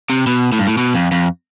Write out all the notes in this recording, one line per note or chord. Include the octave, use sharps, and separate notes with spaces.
C3
B2
A2
G2
A2
B2
F2
F2